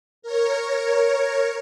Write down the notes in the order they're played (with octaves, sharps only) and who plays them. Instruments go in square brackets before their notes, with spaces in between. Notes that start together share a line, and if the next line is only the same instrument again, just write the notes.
[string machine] A#4 C#5